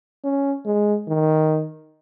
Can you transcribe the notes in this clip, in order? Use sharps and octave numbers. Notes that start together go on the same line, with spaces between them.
C#4
G#3
D#3